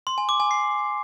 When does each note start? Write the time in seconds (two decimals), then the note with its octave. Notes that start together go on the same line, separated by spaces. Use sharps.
0.07 C6
0.18 G#5
0.29 D6
0.40 G#5
0.51 C7